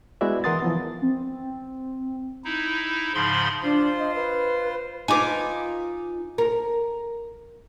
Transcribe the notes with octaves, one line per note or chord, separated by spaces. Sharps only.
G#3 B3 E4 F#4 D5 E5
E3 A#4 F#5 C6 D#6 A6
E3 F3 B3
C4
D#4 E4
G#2 C#3 F3 B5 C6
D4 F4 C5
D#5
B4
D#4 F4 B4 G#5 D6
A#4